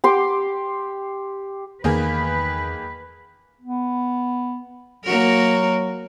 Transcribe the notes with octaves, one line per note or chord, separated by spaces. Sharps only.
G4 C6 D6
E2 D#3 A#3 G#4 B4
B3
F#3 A#3 F#4 A#4